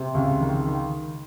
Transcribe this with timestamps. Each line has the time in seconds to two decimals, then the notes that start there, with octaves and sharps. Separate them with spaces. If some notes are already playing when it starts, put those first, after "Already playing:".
Already playing: C3
0.15 C#2
0.41 D#3
0.67 D#3